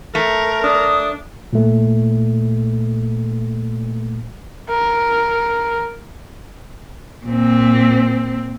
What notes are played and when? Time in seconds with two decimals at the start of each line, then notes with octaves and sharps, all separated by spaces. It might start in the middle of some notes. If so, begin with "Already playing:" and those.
0.15 A3 A#4
0.63 D4 D#6
1.53 A#2 A3
4.70 A#4
7.26 A#2 C4